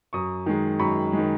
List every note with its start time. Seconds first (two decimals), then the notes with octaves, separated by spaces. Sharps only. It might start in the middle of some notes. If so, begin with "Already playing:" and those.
0.13 F#2 C#6 D#6
0.46 D#3 G#3
0.79 F#2 B5 C#6
1.13 D#3 G#3